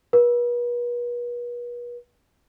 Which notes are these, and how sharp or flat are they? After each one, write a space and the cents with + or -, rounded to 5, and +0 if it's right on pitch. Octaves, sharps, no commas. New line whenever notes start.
B4 -40